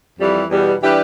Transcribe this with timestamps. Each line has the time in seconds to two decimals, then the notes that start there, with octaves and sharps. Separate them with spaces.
0.19 F2 E3 G3
0.49 E2 B2 G3
0.82 E3 G3 D4 G4 B4